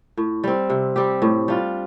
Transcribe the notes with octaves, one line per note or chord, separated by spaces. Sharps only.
A2
G3 C4
C3
G3 C4 G4
A2
G3 D4 F4